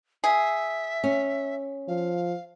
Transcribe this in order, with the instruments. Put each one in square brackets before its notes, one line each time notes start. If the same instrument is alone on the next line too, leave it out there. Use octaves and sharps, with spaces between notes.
[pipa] G#4 [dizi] E5
[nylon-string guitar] C#4
[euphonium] F3 [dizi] F5